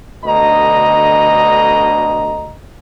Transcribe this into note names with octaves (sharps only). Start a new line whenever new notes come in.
D2 B2 D3 D#5 A#5